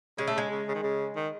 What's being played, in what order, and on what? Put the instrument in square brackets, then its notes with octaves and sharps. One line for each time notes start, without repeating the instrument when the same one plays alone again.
[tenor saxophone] C#3 [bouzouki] G#3
[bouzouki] A3
[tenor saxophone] C#3 [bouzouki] G#3
[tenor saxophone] C#3
C#3
D#3
C#3
D#3